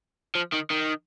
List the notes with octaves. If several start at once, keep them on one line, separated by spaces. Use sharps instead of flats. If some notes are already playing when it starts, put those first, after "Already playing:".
F3
D#3
D#3